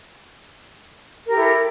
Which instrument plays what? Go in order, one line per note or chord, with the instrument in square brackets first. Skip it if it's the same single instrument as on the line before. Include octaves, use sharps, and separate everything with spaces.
[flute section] A#4
G4
A4
E4